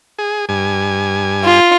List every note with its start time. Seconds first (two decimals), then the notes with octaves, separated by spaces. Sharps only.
0.19 G#4
0.49 G2 G#5
1.45 F4